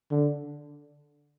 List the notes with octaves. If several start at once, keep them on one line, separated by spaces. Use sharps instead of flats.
D3